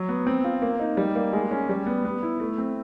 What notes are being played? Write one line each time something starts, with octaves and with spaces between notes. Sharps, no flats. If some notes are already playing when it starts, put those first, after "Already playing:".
Already playing: F#3
B3
C4
F4
A#3
D#4
G3
A#3
G#3
C#4
G3
B3
B3
E4
A3
C4